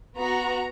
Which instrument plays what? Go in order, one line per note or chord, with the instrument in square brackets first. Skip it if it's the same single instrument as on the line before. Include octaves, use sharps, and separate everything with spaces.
[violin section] B3 F#4 A#5